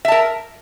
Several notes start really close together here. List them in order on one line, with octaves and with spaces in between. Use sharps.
E5 A5 A#4